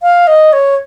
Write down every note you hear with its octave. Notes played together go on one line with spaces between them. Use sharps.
F5
D#5
C#5